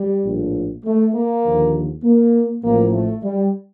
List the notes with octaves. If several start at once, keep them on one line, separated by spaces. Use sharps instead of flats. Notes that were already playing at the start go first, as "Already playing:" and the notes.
Already playing: G3
A#1 A2 F3
A3
A#3
D#2 D3 F3
A#3
A1 A2 F3 A#3
A3
G3